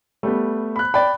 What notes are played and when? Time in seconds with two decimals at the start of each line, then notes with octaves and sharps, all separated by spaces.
0.23 G3 A3 B3
0.76 B5 F#6
0.94 D5 G5 B5